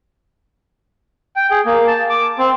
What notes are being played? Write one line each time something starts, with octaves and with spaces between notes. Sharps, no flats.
G5
G#4
A#3
A5
D6
C4